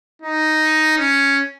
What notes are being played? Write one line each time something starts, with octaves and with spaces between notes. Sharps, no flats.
D#4
C#4